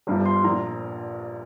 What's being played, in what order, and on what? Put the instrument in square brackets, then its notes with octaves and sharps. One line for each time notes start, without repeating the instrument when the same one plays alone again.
[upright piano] G1 G2 F3
C6
A#1 A#2 F3 A#5